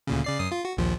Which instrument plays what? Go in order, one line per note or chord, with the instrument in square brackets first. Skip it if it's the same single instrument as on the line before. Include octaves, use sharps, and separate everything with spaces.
[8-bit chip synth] D2 A#2 C#3
C#3 D5 C7
F#2 D#6 C7
F4
F#4
A#1 D#2 F3